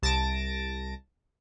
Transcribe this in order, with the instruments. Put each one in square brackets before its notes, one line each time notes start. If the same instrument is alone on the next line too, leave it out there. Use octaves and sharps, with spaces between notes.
[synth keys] C2 A5 A6 A#6 D7